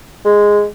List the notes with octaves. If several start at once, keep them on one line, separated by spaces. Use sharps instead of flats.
G#3